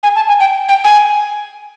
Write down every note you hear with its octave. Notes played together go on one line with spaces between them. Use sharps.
G#5
A5
G#5
G5
G5
G#5